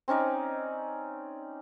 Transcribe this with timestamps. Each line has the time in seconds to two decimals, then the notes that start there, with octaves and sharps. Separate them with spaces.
0.08 C4 C#4 D#4 D5